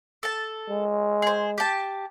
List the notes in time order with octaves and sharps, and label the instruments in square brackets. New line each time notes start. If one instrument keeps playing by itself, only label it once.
[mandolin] A4 A5
[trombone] G#3
[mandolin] G#4 C5
G4 A5